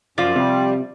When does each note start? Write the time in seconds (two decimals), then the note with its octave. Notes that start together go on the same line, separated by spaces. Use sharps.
0.18 F#2 F3 F4 D5
0.36 C3 G3